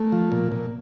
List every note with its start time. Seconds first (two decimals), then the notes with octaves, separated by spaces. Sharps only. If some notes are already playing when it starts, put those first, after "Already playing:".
Already playing: A3
0.12 F3
0.32 A#2
0.52 A#2